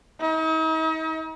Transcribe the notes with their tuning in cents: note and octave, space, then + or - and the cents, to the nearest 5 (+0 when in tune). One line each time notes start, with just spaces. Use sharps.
D#4 +45